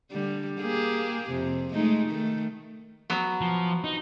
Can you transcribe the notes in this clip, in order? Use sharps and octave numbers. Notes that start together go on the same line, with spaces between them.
D3 G3
A#3 G4 G#4
F2 C3
G#3 A3 D#4
D#3 A3
F#3 B3
F3
D#4